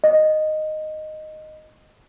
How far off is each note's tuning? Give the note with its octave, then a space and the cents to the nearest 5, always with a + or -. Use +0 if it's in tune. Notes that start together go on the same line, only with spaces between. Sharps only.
D#5 -5